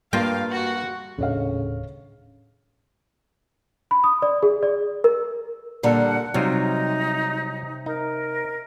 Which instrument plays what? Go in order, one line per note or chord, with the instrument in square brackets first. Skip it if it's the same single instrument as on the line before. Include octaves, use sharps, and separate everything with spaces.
[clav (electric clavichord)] G2 F4 G5 [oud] A#3 [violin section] F5
[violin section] F#4
[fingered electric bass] D#1 A2 D4 [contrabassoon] C#3 [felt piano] A4 C#5 F5
[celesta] B5
D#6
D5
G#4
D5
A#4
[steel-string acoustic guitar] A#2 D3 G3 [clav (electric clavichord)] A4 A#4 [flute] F#5
[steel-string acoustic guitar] C3 [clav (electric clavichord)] F#3 G3 F4 [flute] D#4
[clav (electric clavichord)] D#4 [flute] A#4